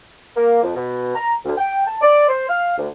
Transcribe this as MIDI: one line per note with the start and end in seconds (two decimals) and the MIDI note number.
0.36 0.59 58
0.63 0.74 41
0.75 1.13 47
1.15 1.34 82
1.45 1.53 38
1.58 1.83 79
1.87 1.97 81
2.02 2.27 74
2.28 2.47 72
2.49 2.74 77
2.78 2.87 38